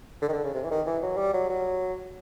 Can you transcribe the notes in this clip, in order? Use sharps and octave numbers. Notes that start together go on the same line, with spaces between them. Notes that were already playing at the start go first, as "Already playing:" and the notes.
D3
D#3
D3
C#3
C3
E3
D#3
E3
F#3
G3
F#3
F#3